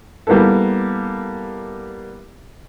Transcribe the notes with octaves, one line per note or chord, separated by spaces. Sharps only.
G3 A#3 B3 E4 A4